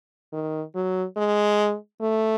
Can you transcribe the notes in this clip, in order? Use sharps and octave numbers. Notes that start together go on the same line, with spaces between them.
D#3
F#3
G#3
A3